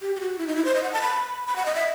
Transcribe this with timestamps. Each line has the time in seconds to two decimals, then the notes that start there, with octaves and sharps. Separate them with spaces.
0.01 G4
0.16 G4
0.20 F#4
0.38 E4
0.47 D#4
0.56 E4
0.65 C5
0.75 D#5
0.83 F#5
0.93 A5
1.02 B5
1.47 B5
1.56 F#5
1.66 D#5
1.75 E5